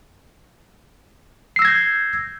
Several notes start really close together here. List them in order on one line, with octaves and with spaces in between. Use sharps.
C7 E6 A#6 G#6 G6